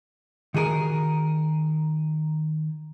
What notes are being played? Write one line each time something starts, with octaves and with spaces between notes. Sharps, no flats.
D#3 F#4 G#4 A#4